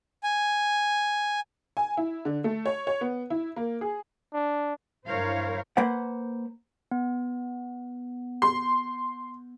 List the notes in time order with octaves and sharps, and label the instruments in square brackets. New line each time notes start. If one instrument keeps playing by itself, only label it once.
[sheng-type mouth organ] G#5
[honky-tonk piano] G#5
E4
D3
A3
C#5
C#5
B3
E4
A#3
G#4
[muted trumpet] D4
[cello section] G2 E4 A#4 C5 C#5 F5
[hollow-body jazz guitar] A#3 B4 C5 F#5
[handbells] B3
[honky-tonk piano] C6